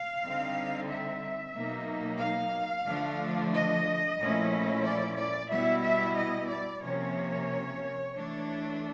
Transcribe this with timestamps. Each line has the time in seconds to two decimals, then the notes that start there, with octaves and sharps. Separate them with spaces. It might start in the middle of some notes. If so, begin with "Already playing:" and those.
Already playing: F5
0.23 D3 G3 C4 D#4
0.89 E5
1.55 B2 F#3 A#3 D#4
2.21 F5
2.88 D3 F3 A3 D4
3.53 D#5
4.19 A#2 F3 A3 C#4 E4
4.85 D5
5.17 D5
5.50 B2 G3 B3 E4 E5
5.83 E5
6.17 D#5
6.49 D5
6.82 C3 F3 A#3 C#4 C#5
8.14 E3 A3 D4